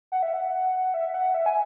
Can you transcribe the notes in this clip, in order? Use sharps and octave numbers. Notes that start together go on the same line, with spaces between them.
F#5
E5
F#5
E5
E5
F#5
E5
G#5